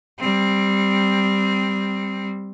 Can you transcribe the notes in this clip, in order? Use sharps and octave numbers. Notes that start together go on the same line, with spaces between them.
G3 C4